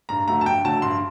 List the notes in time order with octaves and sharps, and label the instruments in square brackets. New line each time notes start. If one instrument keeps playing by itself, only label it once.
[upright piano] G2 A#5
D3 F#3 A3 A#5
A5
G2 G5
D3 F#3 A3 A5
G2 C6